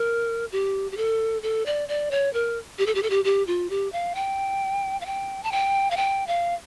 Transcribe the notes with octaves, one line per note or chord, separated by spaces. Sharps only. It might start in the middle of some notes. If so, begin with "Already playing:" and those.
Already playing: A#4
G4
G4
A4
A4
D5
D5
C#5
A#4
G4
A4
G4
A4
G4
G4
F4
G4
F5
G5
F5
G5
A5
G5
F5
G5
F5